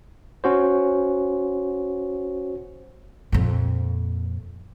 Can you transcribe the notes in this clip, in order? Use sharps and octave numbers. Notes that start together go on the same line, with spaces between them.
C#4 F#4 C5
F2 A#2